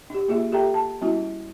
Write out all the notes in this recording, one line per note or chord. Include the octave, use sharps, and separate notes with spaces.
D4 G4
A#3 F4 G#4 E5
G4 A4 E5 G5 A#5
A5
G3 B3 C#4 E4 F#4